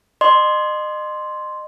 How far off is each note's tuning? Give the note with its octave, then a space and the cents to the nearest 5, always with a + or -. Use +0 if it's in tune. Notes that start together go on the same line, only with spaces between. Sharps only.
D#5 -35 C6 +0